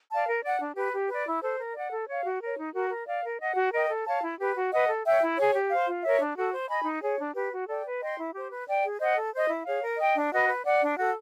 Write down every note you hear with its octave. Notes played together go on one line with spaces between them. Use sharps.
D5 F5 A5
A#4
D5 F#5
D4
G4 B4
G4
B4 D5
E4
A4 C5
A#4
D5 F#5
A4
C#5 F5
F#4
A#4 C#5
D#4
F#4 A#4
A#4
D5 F5
A#4
D#5 F#5
F#4
A#4 D#5 G5
A4
C#5 F5 A5
E4
G4 B4
F#4
B4 D#5 F#5
A4
C#5 E5 G5
E4
G#4 C#5
G4
C5 F5
F4
A#4 C#5 E5
D4
F#4 A4
C5
D#5 G#5 B5
D#4
G#4 C#5
D4
G4 B4
F#4
A4 D5 G5
B4
D#5 G5 C6
E4
G4 C5
B4
D5 G5
G#4
C5 D#5 F#5
A4
C5 D#5
E4
G#4 C#5 F5
A#4
D#5 G5
D4
F#4 B4 D#5
B4
D5 F#5
D4
F#4 A4